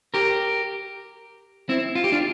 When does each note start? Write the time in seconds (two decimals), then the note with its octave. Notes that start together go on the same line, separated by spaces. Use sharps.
0.14 G4 A#4
1.69 C4 E4
1.95 F4
2.04 G4
2.12 D4 F4